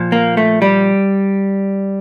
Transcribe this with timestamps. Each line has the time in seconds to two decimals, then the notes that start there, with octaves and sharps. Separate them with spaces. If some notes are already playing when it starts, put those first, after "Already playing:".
Already playing: A#2 F3
0.12 A#3
0.37 A3
0.62 G3